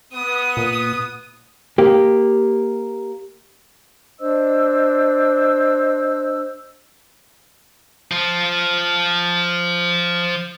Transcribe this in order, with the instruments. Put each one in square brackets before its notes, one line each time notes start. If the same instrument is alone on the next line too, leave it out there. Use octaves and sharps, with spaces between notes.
[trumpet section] B3 [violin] D#6
[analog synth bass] A#2
[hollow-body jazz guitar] A#3 G4
[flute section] D4 C5 D#5 E6
[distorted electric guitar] F3 F4